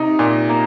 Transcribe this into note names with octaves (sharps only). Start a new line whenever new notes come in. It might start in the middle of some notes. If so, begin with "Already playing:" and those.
Already playing: C3 D#4
A#2
A#3